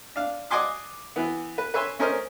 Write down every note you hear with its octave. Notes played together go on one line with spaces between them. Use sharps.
D4 F5
D5 D#5 F#5 G#5 C6 D6
E3 B3
B4
B4 C#5 E5 G#5 C6
A3 C#4 A#4 C5 D#5 F6